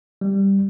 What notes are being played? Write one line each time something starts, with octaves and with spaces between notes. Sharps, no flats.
G3